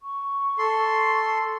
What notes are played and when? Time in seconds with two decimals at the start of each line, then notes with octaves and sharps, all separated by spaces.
0.03 C#6
0.58 A4 C6